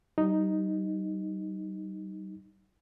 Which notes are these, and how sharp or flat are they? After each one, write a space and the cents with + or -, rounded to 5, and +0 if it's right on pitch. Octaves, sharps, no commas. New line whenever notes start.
G3 -35 D#4 +0